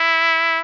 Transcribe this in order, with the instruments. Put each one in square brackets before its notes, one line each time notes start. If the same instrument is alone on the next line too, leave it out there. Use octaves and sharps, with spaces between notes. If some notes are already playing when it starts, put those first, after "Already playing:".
Already playing: [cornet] E4